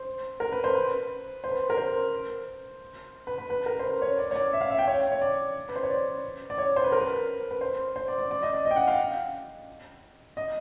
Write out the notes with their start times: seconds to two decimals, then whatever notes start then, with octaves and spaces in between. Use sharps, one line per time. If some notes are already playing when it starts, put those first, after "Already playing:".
Already playing: C5
0.40 A#4
0.52 B4
0.64 C5
0.75 B4
1.44 C5
1.51 B4
1.70 A#4
1.77 C5
3.27 B4
3.38 B4
3.50 B4
3.66 A#4
3.79 C5
3.83 B4
4.02 C#5
4.19 D5
4.31 C#5
4.36 D5
4.53 E5
4.61 F5
4.70 E5
4.78 G5
4.88 C#5
5.12 C#5
5.22 D5
5.69 B4
5.76 C5
5.83 C#5
5.90 D5
6.50 D5
6.58 C#5
6.76 C5
6.84 B4
6.92 A#4
7.00 B4
7.51 B4
7.61 C5
7.96 C5
8.08 D5
8.18 D5
8.31 D5
8.42 D#5
8.53 D5
8.65 D#5
8.71 G5
8.76 F#5
8.88 F5
10.37 D#5